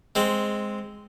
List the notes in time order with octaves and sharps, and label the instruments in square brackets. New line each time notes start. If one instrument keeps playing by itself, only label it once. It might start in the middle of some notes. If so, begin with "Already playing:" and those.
[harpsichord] G#3 C4